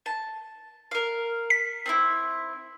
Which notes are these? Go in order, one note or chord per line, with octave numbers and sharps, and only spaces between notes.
A5
A#4 F5
B6
C4 D4 E4